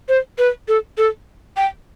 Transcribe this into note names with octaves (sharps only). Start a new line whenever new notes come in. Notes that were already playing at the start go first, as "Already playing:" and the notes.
C5
B4
A4
A4
G5